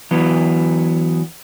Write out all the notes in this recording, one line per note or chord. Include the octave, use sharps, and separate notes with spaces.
E3 F#3 B3